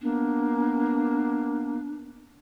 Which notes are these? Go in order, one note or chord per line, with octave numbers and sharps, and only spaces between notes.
A#3 B3 D4